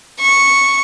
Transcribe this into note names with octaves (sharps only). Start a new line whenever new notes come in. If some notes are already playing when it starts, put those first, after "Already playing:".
C#6